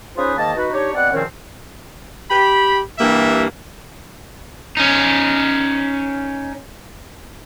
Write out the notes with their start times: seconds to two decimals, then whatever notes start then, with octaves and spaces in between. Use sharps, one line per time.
0.16 C#4 D#4 F4 G#4 B4 C5
0.36 G#2 D#3 A#3 D#5 A5
0.56 D#4 F#4 B4
0.72 D4 D#4 G4 C#5
0.94 B2 C4 D5 F#5
1.13 E2 A#2 D#3 F3 C4 C#4
2.30 G4 B5
2.99 G2 E3 A#3 G4 E5
4.77 C#4 D#4